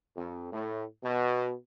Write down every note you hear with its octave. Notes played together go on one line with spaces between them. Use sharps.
F2
A2
B2